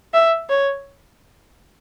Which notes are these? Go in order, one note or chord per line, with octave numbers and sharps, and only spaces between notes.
E5
C#5